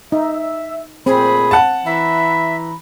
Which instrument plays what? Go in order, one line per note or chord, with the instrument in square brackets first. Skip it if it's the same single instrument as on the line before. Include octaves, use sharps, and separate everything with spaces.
[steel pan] D#4 [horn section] E5
[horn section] A#2 A3 B5 [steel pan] C4 [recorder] G#4
[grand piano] F#5 A5
[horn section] E3 A#5 B5 [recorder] E5